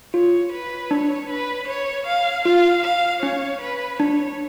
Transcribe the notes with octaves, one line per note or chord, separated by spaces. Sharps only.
F4 C#5
B4
D4 C#5
B4
C#5
F5
F4 F5
F5
C#4 C#5
B4
D4 C#5